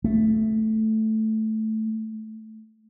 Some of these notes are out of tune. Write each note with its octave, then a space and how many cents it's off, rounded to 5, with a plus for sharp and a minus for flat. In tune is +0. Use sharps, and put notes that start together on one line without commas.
A3 -5